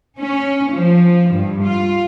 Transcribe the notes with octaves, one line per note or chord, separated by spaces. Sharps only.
C#4
F3
G2
F4